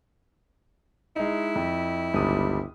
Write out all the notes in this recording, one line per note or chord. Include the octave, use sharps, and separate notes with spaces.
G#3 D#4 E4
F2
G1 C#2 G3 D#6